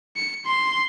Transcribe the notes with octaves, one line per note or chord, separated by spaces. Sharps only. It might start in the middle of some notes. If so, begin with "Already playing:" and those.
C#7
C6